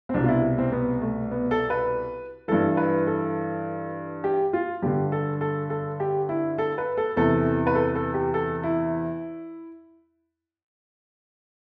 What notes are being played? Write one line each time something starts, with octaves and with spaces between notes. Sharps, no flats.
C4
C2 B2 D4
F4
E4
C4
B3
A3
B3
A4
B4
G2 E3 A4
B4
A4
G4
F4
G2 D3 G4
A4
A4
A4
G4
E4
A4
B4
A4
E2 C3 E3 A4
B4
A4
A4
G4
A4
E4